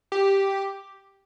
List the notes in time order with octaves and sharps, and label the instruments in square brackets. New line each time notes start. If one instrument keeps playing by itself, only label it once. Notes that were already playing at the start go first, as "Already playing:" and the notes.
[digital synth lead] G4